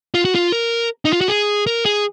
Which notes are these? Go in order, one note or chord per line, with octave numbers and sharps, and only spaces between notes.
F4
F#4
F4
A#4
D#4
F4
F#4
G#4
A#4
G#4